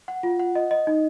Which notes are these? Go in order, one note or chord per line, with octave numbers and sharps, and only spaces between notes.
F#5
F4
F#5
D#5
D#5
D#4